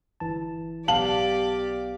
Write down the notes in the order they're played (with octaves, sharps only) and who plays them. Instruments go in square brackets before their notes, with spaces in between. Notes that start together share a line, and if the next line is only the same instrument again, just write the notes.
[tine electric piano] G1 E3 A5
[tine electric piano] B1 B3 [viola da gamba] G4 D5 [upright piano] F5 F#7 [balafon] A5